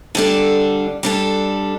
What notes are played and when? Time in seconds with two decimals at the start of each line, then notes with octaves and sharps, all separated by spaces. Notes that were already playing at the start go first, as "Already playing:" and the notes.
0.15 D3 G3 D4 A4
1.03 G3 D4 A4